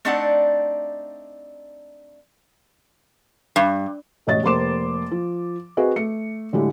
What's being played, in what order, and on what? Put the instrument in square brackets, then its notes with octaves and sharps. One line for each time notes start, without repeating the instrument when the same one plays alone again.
[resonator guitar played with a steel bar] A3 C4 D4 D#4 D5 F#5
G2
[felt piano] E1 A1 C#5 D#5 A6
F1 A#3 C5 C6 D6 E7
F3
C4 F#4 G#4 B4 D#5
A3 C#7
A2 D3 F#3 G#3 E4 G4